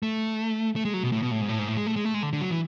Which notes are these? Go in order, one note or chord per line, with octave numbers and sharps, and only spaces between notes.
A3
A3
G#3
F#3
B2
A2
B2
A2
G#2
A2
G#2
A2
G#3
A3
G#3
A3
G#3
D3
D3
F#3
E3